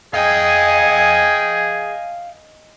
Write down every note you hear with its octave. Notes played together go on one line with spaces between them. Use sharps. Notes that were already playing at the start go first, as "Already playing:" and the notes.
G#4 D#5 F5 G5 G#5